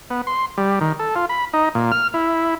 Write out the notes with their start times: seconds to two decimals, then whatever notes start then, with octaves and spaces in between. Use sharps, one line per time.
0.10 B3
0.27 C6
0.57 G3
0.81 D#3
0.99 A4
1.16 F4
1.29 B5
1.53 D#4
1.75 A#2
1.92 F6
2.14 E4